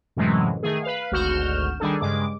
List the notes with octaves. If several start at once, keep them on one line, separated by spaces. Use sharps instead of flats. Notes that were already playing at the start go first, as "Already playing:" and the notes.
F#2 A2 C3 E3 F#3 G#3
D#3 A3 G#4
B4 F5
G#1 D2 F#4 F6 G6 E7
D#3 G3 D4 G#4 A4
G2 C#3 G#3 D6